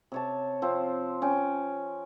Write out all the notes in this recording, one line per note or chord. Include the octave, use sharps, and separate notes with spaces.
C3 C#5 A5
F3 C4
C#4 G5